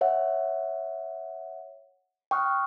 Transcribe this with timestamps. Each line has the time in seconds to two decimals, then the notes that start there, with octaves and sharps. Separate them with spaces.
0.01 C#5 E5 F#5
2.31 G5 C#6 D#6 F6 F#6